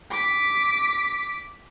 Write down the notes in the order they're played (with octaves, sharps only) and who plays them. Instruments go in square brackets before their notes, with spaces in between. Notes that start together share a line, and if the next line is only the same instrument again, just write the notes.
[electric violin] D6 B6